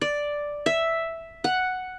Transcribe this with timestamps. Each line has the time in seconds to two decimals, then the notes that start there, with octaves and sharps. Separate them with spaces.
0.01 D5
0.66 E5
1.44 F#5